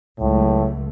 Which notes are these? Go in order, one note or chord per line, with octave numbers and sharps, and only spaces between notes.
C#2 A2 F#3 A3